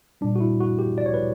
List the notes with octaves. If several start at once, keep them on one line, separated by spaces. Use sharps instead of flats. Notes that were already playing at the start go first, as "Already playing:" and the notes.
A#2 G3 D4
F#4
E4
F#4
G4
D5
C#5
B4